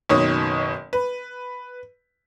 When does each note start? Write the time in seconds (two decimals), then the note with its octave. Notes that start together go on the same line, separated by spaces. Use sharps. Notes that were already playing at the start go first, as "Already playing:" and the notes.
0.09 F#1 B2 D#3 C#5 D#6
0.93 B4